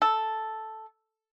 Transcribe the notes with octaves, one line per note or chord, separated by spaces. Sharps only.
A4